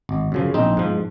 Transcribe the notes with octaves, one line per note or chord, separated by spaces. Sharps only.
G#1
F#2 C#3 F3
A#1 C4 D#4
G#2 F3